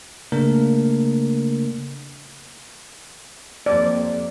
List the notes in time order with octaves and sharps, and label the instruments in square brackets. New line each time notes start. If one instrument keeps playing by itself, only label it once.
[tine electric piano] C#3 A3 A#3 D4 A#4
[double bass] F2 A#3 [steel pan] D5